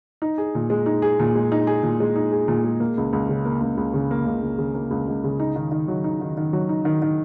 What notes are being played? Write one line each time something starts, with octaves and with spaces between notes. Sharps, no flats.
D#4
G#4
A#2
G#3
D#4
G#4
A#2
G#3
D#4
G#4
A#2
G#3
D#4
G#4
A#2
G#3
A#3
C#2
C#2
C#3
A#3
C#2
C#2
C#3
A#3
C#2
C#2
C#3
A#3
C#2
C#2
C#3
D#4
D#3
D#3
F#3
D#4
D#3
D#3
F#3
D#4
D#3
D#3